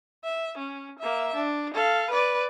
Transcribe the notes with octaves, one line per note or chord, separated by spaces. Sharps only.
E5
C#4
A#3 E5
D4
A4 F5
B4 D5